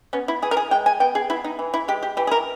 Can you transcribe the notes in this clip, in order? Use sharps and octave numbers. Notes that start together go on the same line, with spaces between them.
B3 C#4
E4
E3 G#4
A#4
G#4
G#3 G5
G#5
B3 G5
G#4
B3 E4
D#4
E3
E4
G#3 G4
G4
E3 G4
G#4
A#4